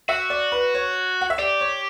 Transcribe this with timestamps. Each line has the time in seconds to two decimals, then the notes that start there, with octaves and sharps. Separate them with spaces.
0.09 F#4 E5
0.30 D5
0.52 B4
0.74 C#5
1.21 F#5
1.30 E5
1.38 G4 D5
1.61 C#5